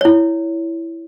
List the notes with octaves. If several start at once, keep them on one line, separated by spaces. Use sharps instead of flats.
E4 C#5